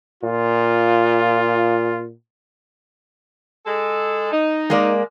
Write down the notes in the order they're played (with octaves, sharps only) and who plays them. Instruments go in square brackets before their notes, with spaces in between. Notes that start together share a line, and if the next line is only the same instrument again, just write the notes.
[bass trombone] A#2 [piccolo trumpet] F4
[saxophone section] G#3 A4
D#4
[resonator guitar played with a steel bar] G#3 A#3 D5